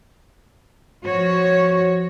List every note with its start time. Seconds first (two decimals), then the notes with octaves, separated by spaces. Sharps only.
1.06 F3 F#4 C#5